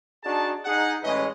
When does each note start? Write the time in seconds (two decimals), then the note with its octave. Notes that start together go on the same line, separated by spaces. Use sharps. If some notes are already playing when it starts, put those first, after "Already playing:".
0.24 D4 D#4 F#4 G#4 A5
0.65 D#4 G#4 F#5
1.03 A1 E3 G#3 C#4 B4 D#5